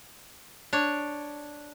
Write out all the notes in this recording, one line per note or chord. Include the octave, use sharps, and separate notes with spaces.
D4 C#5